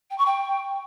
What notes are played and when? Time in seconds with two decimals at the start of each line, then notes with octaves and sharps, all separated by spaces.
0.10 G5
0.18 C#6
0.26 G5